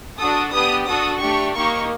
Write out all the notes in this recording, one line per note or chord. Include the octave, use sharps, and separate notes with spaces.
D4 F#4 A4 D#6
B3 D4 G4 D#6
D4 F#4 A4 D#6
A3 D4 G4 C#6
A#3 D#4 G4 C#6